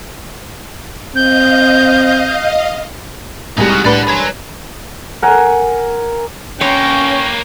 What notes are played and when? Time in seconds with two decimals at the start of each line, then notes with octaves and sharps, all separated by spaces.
1.16 C4 D#5 F5 G6
3.58 C2 A2 G3 G#3 D#4 F#4 G#5
3.70 D#4 F#4 C#6 D#6 F6
3.85 A2 D4 B4 D5 F#5
4.08 C#5 G#5 A#5 C6
5.22 A#4 F#5 G#5
6.61 A#3 C#4 B4 C#5 G5